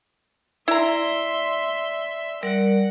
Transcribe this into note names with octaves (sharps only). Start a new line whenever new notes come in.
E4 D5 E5 A#5 C6
G3 A#4 D5 F#5